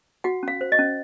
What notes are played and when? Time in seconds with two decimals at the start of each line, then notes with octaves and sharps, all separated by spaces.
0.24 F#4 F#5
0.43 C#4 F5
0.61 C5
0.72 D#5
0.79 C#4